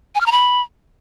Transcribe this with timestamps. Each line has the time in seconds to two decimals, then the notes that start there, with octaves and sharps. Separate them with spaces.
0.15 G#5
0.21 F6
0.26 A#5
0.32 B5